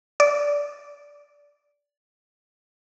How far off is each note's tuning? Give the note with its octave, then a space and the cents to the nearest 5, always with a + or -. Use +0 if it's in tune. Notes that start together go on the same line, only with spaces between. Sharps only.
D5 -15